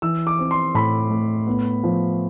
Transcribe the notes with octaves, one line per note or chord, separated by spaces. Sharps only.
E3 E6
D6
C4
C6
A2 B5
A3
B3
F3